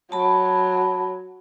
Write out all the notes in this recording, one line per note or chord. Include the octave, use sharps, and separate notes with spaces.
F#3 A5 B5